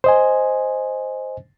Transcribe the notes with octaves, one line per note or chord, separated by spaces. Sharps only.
C5 D#5 G#5